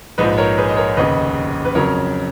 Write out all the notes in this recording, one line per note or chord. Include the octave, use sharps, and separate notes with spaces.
A#1 G#2 F3 B4 D#5
A#4 C#5
G#4 B4
D#5
A#4 C#5
F1 D#2 C#3 B4 D#5
B4
F2 C#3 F#3 A#4 C#5